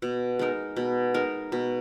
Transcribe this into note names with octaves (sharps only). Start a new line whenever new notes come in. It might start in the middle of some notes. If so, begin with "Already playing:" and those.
B2
G#3 D#4 A#4
B2
G#3 D#4 A#4
B2